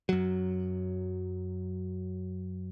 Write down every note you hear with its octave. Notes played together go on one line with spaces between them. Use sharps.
F#2 F#3